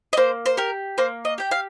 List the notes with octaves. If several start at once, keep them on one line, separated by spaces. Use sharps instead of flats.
D#5
A#3 C5
C5
G4 A#4
A#3 C5
D#5
G4 G5
F5